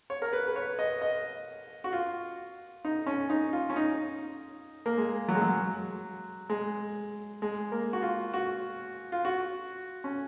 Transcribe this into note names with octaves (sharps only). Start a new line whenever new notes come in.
C#5
A#4
B4
B4
C#5
D#5
D#5
F#4
F4
D#4
C#4
D#4
F4
C#4
D#4
A#3
G#3
F#3
G#3
F#3
G#3
G#3
A#3
F#4
F4
F#4
F4
F#4
C#4